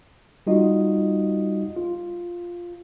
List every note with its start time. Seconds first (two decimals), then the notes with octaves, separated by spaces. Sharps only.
0.47 G3 D#4 F4 F#4 D#5
1.76 F4